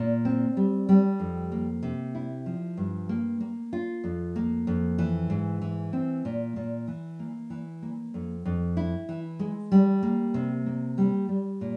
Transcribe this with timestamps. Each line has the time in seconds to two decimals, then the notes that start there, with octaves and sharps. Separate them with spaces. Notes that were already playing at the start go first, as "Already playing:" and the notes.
Already playing: A#2
0.25 C4
0.57 G3
0.89 G3
1.20 F2
1.52 A#3
1.83 C3
2.15 E4
2.46 F3
2.77 G2
3.09 A#3
3.40 A#3
3.73 F4
4.04 F2
4.36 A#3
4.67 F2
4.98 E3
5.30 G#2
5.62 E3
5.93 C4
6.25 A#2
6.56 A#2
6.88 E3
7.20 A#3
7.50 E3
7.82 A#3
8.14 F2
8.45 F2
8.77 E4
9.09 E3
9.39 G#3
9.72 G3
10.03 A#3
10.34 C3
10.66 A#3
10.98 G3
11.29 G3
11.61 A#2